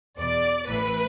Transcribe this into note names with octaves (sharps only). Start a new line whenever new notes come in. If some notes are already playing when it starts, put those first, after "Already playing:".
E2 B2 D5
A1 A2 E3 B4